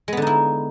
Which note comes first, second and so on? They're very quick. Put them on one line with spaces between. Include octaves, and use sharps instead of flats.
G#3 B3 D3 D#4 E4